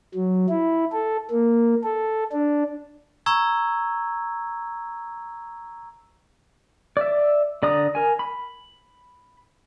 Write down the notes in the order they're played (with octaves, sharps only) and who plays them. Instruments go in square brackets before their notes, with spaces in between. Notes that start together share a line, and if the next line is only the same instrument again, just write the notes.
[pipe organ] F#3
E4
A4
A#3
A4
D4
[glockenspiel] A#5 C#6 E6 G#6
[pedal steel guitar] D5 E5
D3 D5 A#5 D#6
A#4 G#5
B5